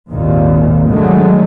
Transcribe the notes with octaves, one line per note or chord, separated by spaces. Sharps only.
G#1 D#2 A#2 D#3
D3 D#3 F#3 G#3 A3